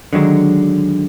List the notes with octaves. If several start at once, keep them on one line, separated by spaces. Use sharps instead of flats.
D3 D#3 F#3 G#3